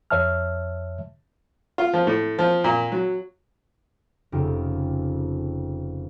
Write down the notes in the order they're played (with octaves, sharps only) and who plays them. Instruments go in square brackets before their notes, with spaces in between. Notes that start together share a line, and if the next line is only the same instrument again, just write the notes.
[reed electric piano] F2 C#5 E5 A5 F6
[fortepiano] F4
F3
A2
F3
A#2
F#3
[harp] F1 F2 C#3 D#4 G4 D7